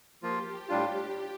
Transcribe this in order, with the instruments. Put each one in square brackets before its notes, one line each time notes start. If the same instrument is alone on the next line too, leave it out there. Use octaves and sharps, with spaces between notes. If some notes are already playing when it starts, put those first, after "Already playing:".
[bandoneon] F3 A#3 F4 [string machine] G4
[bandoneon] A2 G3 D4 F4